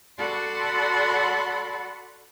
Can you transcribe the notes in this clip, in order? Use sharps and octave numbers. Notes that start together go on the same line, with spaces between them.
F#4 A4 D5 F#5 B5 C6